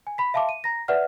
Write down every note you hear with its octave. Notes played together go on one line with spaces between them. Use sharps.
G#5
B5 B6
E5 F5 A5 C6 D6
D#7
A#5 A#6
B4 D5 E5 F#5 F6